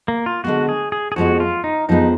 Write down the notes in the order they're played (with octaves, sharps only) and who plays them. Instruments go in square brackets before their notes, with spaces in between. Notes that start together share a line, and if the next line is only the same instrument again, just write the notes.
[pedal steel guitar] A#3
F4
[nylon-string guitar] D3 G#3 B3 [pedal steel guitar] F#4
[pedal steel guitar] G#4
G#4
G#4
[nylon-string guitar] F2 F3 G#3 B3 [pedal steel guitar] F#4
[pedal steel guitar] F4
D#4
[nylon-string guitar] F2 F3 G#3 B3 [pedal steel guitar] D#4